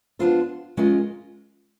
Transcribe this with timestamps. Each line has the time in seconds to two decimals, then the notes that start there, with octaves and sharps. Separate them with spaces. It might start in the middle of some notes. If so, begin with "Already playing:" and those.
0.19 B3 D4 F4 A4 C5
0.77 G#3 C#4 F4 A#4 D#5